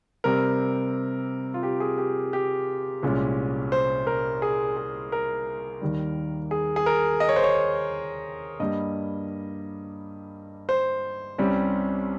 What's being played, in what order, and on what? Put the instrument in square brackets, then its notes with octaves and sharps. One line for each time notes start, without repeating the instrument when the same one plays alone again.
[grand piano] C3 G3 C4 A#4
F4
G4
G#4
G4
G4
C2 A#2 G#3 C#4
C5
A#4
G#4
G#4
A#4
D#2 D#3 G3
G#4
G#4
A#4
D#5
C#5
C5
C#5
G2 G3 A#3 D#5
C5
C2 C3 G3 C#4